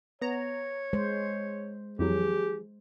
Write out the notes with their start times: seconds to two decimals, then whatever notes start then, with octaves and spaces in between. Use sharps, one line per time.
0.22 B3 C#5 A#5
0.93 G#3 C5
1.99 F2 E3 F#3 G4 G#4